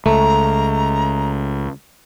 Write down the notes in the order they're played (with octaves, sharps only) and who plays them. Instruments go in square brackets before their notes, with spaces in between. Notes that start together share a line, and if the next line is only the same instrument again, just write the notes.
[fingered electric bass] C#2 [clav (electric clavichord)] A3 [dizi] A#5